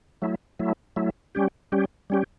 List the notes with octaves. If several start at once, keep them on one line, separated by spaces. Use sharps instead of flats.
F#3 A3 E4
F#3 A3 E4
F#3 A3 E4
G3 C#4 G4
G3 C#4 G4
G3 C#4 G4